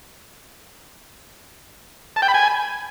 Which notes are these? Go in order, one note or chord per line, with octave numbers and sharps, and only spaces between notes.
A5
G5
B5
G#5